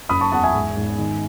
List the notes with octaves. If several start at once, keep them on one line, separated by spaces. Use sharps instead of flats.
F#1 B5 D#6
A5 C#6
E2 F#5 A5
E5 G#5
G#2
G#2
D#3